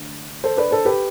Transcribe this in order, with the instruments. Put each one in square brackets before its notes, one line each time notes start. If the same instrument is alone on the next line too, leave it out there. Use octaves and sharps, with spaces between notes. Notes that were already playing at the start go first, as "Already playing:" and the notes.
Already playing: [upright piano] D3 A3
A4 C5
B4 D5
A4 C5
G4 B4